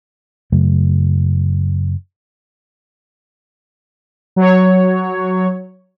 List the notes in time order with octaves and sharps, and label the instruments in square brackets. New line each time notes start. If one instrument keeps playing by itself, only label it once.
[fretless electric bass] F#2 C#3 F#3 A3
[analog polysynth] F#3 C#5